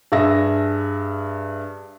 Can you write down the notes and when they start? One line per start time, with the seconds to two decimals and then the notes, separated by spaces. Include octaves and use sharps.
0.12 G2 G#4 E5 E6 A#6